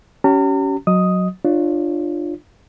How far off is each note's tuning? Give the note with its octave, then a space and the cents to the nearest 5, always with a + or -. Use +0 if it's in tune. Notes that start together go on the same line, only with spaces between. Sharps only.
C#4 +15 G4 -40 A#5 -45
F#3 -10 D#5 +0 D#6 +5
D4 +30 F4 +0 C#5 +0